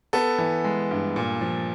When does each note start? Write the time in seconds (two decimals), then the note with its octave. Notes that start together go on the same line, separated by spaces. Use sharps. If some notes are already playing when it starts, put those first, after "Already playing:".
0.13 B3 A4
0.38 E3
0.64 G#3
0.91 G2
1.16 A#2
1.41 F3